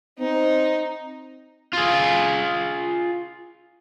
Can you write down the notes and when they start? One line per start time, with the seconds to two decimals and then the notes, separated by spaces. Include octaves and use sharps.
0.19 C4 D#4
1.73 F4 G#4